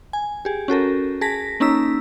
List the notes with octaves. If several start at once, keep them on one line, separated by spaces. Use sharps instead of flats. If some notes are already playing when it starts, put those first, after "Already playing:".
G#5
G4 G#4
C#4 F#4 A4 A#4
G#4 A5 A#6 B6
A#3 C#4 D#4 A#5 E6 B6